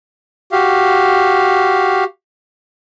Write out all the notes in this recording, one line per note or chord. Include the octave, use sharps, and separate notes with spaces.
F#4 G4 F5